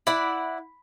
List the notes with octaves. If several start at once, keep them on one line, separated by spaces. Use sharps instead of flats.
E4 D5 F#5 B5